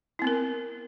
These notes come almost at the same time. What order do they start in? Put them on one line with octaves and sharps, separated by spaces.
E4 C4 B3 A#4